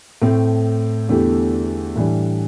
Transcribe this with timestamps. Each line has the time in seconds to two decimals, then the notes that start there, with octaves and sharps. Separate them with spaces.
0.22 A2 A3 C4
1.09 E2 D3 A3 E4 G4
1.96 A2 E3 G3 D4